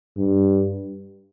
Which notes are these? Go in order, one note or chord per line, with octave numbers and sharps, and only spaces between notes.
G2